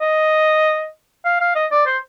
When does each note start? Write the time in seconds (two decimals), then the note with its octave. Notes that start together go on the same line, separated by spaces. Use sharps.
0.01 D#5
1.25 F5
1.41 F5
1.55 D#5
1.71 D5
1.87 C5